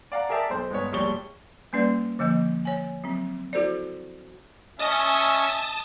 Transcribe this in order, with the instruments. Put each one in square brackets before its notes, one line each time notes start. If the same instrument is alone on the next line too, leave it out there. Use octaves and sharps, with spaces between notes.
[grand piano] D5 F5 F#5 A#5
G#4 A#4 D5 E5 G5 A5
B1 C5
G1 G#3 B3 C#5
E1 A#1 G3 C#5 C#6 G7
[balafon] G3 A#3 C#4 B4 D5
D3 F3 A#3 D#5
C#5 G#5
F#3 C4
E4 F#4 A4 C5 D5
[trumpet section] C#4 [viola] D#5 [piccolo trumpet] E5 [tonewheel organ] A5 D#6